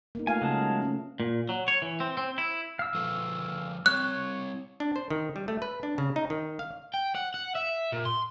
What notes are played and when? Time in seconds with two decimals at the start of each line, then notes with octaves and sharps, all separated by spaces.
0.15 A#3 B3 D#4
0.27 A3 F4 F5 G#5
0.42 C#3 F#3 G#3 A5
0.82 A3 C#4
1.20 A#2
1.49 F#3
1.68 C#5
1.82 E3
2.00 C4
2.17 C4
2.38 E4
2.79 F5 E6
2.95 F3 A4 B4
3.86 G3 C4 C#5 F#6
4.80 D4
4.96 C5
5.10 D#3
5.36 G3
5.48 A3
5.62 B4
5.83 D4
5.98 C#3
6.16 D#4
6.30 D#3
6.59 F5
6.94 G5
7.15 F#5
7.34 F#5
7.55 E5
7.92 A#2
8.05 C6